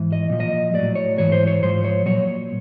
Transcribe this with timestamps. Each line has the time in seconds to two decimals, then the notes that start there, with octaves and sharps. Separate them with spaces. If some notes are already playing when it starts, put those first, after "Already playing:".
Already playing: G#2 E3
0.13 D#5
0.30 A#2 F3
0.40 D#5
0.74 A2 F#3 D5
0.95 C#5
1.18 G#2 E3 C#5
1.32 C5
1.47 C#5
1.63 G#2 F3 C5
1.85 C#5
2.06 A#2 F#3 C#5